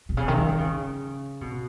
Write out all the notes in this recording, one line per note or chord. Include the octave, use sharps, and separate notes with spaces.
B2
C#3
D#3
F#3
D#3
C#3
B2